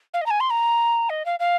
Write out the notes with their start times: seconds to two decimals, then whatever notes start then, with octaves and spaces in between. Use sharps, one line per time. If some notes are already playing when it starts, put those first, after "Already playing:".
0.14 F5
0.21 D#5
0.26 A#5
0.30 G#5
0.40 C6
0.50 A#5
1.10 D#5
1.26 F5
1.40 F5